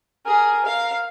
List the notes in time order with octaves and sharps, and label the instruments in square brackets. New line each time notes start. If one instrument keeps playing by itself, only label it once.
[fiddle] G#4 [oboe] A#4
[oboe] A#4 [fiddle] F5